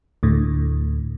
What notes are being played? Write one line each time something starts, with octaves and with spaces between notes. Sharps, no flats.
D2 A2